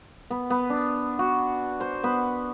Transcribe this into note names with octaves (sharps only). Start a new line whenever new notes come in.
B3
B3
D4
F#4
C5
B3